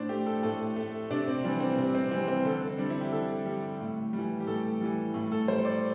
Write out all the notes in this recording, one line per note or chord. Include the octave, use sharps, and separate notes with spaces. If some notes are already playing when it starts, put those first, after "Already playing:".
Already playing: A2 D4 C5
A3 G4
A4
A2 A4
A3
C3 D4
C4
E3 G3 D4
C4
C3
C4
E3 G3 C4
C4
D3 A4
C4
G3 D4
E4
G4
D3 A4
G3 G4
A2
E3 G3
G4
A2 A4
E3 G3
A2
A4
G3 C5
D5